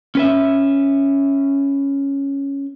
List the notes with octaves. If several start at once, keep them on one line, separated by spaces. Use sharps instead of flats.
C#4 B4 E5